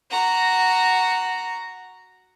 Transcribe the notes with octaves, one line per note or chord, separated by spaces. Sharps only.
F#4 A#5